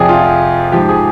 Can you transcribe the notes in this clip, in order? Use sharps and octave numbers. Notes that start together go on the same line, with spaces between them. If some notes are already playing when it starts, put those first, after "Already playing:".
Already playing: F2 C3 F3 G#4 D5
F4
G#2 F3 G4
G#4